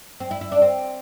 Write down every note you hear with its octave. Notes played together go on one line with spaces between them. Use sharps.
C4
E4
E4
D4
C4